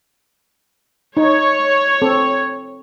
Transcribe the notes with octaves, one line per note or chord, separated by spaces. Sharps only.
D#4 C#5
C4 A4